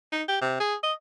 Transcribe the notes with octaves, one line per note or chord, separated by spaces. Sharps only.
D#4
G4
C3
G#4
D#5